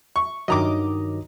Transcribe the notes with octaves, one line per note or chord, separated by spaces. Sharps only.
C#6
G2 D#3 F#3 D#5 A#5 D6